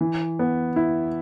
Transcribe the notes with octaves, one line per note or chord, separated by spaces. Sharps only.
E3
B3
E4